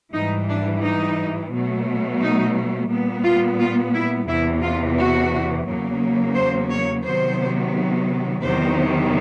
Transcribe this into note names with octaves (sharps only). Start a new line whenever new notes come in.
G#2 E3 G3 D#4
D4
D#4
B2 F#3 A3
D#4
A#2 G3 B3
F4
F4
E4
E2 C3 E3 E4
F4
F#4
E2 C#3 F#3 A#3
C5
C#5
C3 D#3 F#3 B3 C5
E2 C3 D#3 F#3 B3 C5